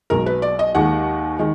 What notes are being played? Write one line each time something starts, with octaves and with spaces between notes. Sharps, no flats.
B1 B2 G#3 A#4
B4
D5
D#5
D#2 D#3 G#3 F#5
D#3 G#3